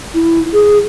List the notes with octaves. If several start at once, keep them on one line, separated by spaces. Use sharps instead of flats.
E4
G#4